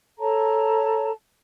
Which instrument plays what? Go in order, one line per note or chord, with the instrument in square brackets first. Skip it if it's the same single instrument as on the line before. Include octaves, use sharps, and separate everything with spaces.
[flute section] A4 C#5 A5 A#5